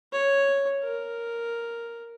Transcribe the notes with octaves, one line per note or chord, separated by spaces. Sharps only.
C#5
A#4